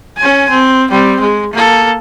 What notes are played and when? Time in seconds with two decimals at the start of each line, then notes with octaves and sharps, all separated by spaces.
0.17 C#4 G#5
0.50 C4
0.91 G3 C4
1.21 G#3
1.53 A#3 A4